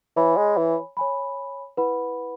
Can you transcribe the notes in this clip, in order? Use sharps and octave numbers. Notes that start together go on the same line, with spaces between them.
E3 C#5 G#5 B5
G#3
E3
C#5 G#5 B5
E4 B4 F#5 B5